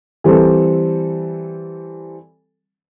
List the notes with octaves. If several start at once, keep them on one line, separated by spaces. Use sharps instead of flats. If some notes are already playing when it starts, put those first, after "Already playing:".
E3 G3 C4 A4